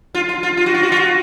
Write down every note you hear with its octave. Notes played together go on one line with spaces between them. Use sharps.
F4
F4
F4
F4
F#4
F4
F#4
F4
F#4